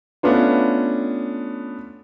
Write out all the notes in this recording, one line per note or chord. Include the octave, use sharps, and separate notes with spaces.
A3 B3 C#4 D4 F4